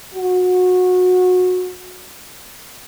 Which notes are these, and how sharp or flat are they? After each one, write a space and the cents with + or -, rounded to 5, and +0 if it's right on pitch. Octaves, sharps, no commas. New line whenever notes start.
F#4 -25